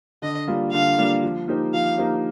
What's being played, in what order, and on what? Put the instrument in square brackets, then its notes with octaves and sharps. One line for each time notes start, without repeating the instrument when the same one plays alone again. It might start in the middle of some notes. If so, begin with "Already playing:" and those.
[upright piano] D3 [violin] D#5
[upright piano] G3 A#3 D4 F4
[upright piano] D3 [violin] F5
[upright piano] G3 A#3 D4 F4
F3
A#3 D#4 G4 C5
[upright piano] F3 [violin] F5
[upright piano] A#3 D#4 G4 C5